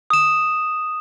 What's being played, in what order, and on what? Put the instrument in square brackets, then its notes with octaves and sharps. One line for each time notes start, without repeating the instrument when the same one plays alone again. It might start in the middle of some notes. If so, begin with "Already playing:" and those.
[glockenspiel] D#6 E7